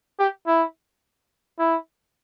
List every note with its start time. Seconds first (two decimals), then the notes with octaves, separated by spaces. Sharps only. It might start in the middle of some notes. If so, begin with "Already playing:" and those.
0.19 G4
0.47 E4
1.59 E4